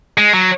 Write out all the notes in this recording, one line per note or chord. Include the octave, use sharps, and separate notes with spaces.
G#3
F#3